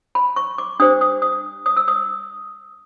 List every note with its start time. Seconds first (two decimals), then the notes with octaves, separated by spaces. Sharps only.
0.15 B5
0.36 C#6
0.58 D6
0.80 D4 G4 C5 D#6
1.01 D#6
1.22 D#6
1.66 D#6
1.77 E6
1.88 D#6